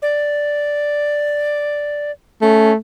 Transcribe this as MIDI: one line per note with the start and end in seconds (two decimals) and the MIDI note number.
0.02 2.11 74
2.42 2.74 57
2.42 2.73 61